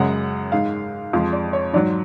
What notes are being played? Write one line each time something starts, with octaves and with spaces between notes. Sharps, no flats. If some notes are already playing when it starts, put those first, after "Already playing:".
Already playing: F#2 C#3 G#3 F#5
G#2 G#3 F5
F2 F3 G#3 F5
D5
C#5
G#2 F#3 D5